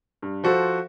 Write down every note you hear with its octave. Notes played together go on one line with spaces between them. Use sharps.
G2
F3 F#4 A4 C5